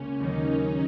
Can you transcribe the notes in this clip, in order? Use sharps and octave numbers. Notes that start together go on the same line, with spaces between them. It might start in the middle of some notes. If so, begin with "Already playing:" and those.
Already playing: C#2 C#3 A#3 C#4
D#2 D#3 F#3 D#4